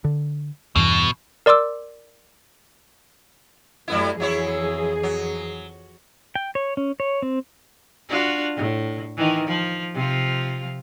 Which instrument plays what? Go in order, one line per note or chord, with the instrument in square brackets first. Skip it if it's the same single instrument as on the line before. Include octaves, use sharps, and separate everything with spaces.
[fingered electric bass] D3
[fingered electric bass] E2 G2 E3 [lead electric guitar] B2
[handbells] A#4 D5 C6 D6 E6
[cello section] F#2 F#3 A3 [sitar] G3 B3 E4
[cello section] F2 E3 G#4 [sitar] F#3 E4 C#5
[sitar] F#3
[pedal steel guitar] G5
C#5
C#4
C#5
C4
[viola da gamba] D4 F4 F#4
A2
D#3 E3
F3
C3 F3 F4